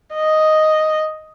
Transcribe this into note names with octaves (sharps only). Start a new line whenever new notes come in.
D#5